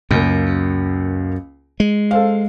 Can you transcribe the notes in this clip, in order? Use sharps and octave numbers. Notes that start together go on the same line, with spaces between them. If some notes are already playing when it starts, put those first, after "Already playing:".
C#2 F#2 A#3
G#3
A4 C5 F5